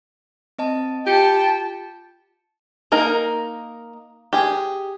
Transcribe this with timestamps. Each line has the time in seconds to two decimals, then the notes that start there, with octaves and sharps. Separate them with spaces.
0.59 C4 D#5 A5
1.07 F4 G4 G5 A5 C#7
2.92 A#3 D#4 A#4
4.33 G4 G#4